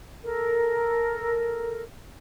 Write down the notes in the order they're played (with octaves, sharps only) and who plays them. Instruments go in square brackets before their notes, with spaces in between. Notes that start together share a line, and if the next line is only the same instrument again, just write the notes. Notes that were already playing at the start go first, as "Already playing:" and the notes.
[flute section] A4 A#4